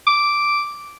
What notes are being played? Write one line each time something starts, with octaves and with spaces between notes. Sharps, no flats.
D6